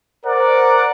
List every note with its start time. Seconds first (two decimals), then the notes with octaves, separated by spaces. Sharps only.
0.25 A#4 C5 D5 F#5